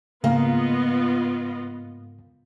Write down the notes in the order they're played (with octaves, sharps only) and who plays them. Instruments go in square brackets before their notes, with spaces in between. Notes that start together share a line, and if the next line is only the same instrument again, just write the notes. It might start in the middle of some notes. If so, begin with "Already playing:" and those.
[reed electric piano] G#2 F5 [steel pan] C#3 [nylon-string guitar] A#3 [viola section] B3 F4 D#5